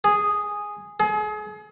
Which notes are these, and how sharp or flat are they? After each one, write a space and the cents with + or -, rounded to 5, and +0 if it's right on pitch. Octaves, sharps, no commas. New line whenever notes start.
G#4 -5
G#4 +35